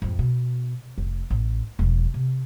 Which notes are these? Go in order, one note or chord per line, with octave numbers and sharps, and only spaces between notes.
F2 G#2
B2
F1
A1
E1 F3
C3